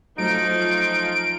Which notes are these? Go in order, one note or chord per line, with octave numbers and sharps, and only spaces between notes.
F3 F#3 A3 D#4 F4 D7